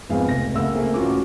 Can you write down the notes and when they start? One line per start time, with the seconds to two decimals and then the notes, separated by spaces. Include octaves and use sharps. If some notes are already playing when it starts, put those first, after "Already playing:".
0.09 G#1 F2 B3 G#4 F5
0.28 F1 A#6
0.55 F#1 A3 A#3 F5 F#5 E6
0.74 A3 A#3 C4 G#4
0.94 A1 C#4 F4 F#4 D6